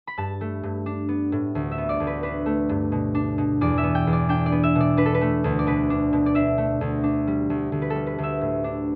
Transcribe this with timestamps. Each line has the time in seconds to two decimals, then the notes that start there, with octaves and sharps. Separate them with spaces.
0.07 B5
0.17 G2 A5
0.41 A3
0.63 G2
0.86 D4
1.09 B3
1.32 A2
1.55 D2
1.72 E5
1.78 B3
1.89 D5
2.00 D2
2.07 B4
2.23 D4 B4
2.46 A3
2.69 G2
2.92 B2
3.15 D4
3.38 B2
3.61 E2 D5
3.78 E5
3.83 B3
3.95 G5
4.07 E2
4.13 D5
4.29 D4 G5
4.46 D5
4.52 B3
4.63 E5
4.75 B2
4.80 D5
4.97 D4 B4
5.06 A4
5.14 B4
5.21 A3
5.44 D2
5.59 D5
5.67 B2 B4
5.90 D4
6.13 B2
6.26 D5
6.35 D4 E5
6.58 A3
6.81 D2
7.04 D4
7.27 G3
7.50 D2
7.72 D2
7.82 B4
7.90 A4
7.95 G3
8.07 B4
8.18 D2
8.23 E5
8.41 A2
8.64 D4